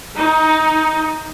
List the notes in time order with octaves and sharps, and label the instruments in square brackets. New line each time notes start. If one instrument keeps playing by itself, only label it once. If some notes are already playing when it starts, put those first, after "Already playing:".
[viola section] D#4